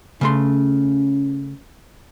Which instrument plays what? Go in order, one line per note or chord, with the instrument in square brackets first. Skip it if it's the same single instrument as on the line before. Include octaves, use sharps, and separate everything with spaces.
[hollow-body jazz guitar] C#3 A3 C6 [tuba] C#4